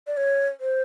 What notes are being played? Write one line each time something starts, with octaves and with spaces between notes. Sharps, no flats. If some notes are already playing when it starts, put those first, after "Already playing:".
D5
C#5
C5